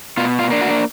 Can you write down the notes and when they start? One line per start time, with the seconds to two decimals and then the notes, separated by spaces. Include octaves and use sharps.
0.17 B2 F4
0.39 F4
0.50 A#3 D4
0.61 F#4